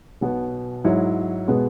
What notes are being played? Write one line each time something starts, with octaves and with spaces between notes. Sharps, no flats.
B1 B2 B3
G#2 F#3 E4 C#5
B2 G#3 B3